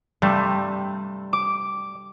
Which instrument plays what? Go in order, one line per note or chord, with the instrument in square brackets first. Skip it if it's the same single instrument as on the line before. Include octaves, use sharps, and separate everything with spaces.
[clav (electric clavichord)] G2 C3 A3 [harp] G3
[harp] D6